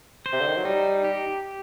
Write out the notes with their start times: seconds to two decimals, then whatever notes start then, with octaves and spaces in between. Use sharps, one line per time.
0.26 C5
0.33 C3
0.40 D3
0.48 D#3
0.57 F#3
0.64 G3 D#4
1.04 G4